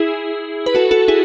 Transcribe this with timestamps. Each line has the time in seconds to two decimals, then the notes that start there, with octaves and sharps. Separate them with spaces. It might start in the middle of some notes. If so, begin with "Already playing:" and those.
Already playing: E4 G#4
0.66 B4
0.75 F#4 A4
0.91 F#4 A4
1.08 E4 G#4